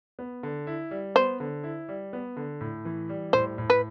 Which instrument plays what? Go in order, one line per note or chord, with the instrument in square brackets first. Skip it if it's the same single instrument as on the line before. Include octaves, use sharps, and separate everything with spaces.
[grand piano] B3
D3
E4
G3
[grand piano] B3 [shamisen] C5
[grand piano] D3
E4
G3
B3
D3
A2
E3
G3
[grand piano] A2 [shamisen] C5
[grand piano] A2
[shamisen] B4